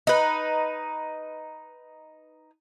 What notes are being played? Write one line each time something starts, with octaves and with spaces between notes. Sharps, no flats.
D#4 B4